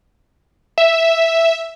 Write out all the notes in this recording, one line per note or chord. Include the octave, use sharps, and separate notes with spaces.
E5